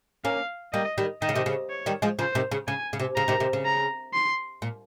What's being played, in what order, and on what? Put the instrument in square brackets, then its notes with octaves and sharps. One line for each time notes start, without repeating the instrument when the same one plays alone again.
[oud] A#3 C#4 [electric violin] F5
[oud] G3 A#3 [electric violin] D#5
[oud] D#3 G3
[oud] D#3 [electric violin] D#5
[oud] C#3
C3 D#3
C#3
[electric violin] C#5
[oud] D#3 G3
F3 G#3
[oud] C#3 F3 [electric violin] C5
[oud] C3 D#3
C#3
[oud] C#3 [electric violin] G#5
[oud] C#3
C3
[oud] C#3 [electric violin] A#5
[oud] C3 D#3
C3 D#3
C#3
[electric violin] A#5
C6
[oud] A#2